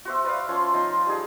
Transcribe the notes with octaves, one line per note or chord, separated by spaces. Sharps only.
F#4 C5 E5
B4 D5 E5 F5
F3 C#4 C6
F3 D#4 C6
G3 D#4 G#4